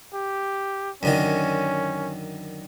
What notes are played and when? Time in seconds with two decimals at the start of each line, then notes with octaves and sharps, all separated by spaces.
0.14 G4
1.03 F#2 D3 D#3 C#4